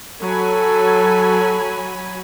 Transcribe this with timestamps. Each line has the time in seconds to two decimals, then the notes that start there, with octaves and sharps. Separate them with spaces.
0.22 F#3 A4 G#5 B5